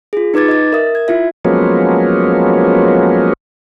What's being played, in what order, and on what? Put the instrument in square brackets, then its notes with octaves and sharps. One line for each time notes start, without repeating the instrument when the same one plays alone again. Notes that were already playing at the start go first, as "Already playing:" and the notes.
[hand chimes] F4 G#4
D#4 B4 D6 G#6 A6
D#5 A6
A#4 E5 D#6
G#6
E4 F4 E5
[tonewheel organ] F3 F#3 G#3 A#3 B3 C#4